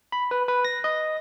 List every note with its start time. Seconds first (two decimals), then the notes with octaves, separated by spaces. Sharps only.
0.12 B5
0.31 B4
0.48 B4
0.65 A#6
0.84 D#5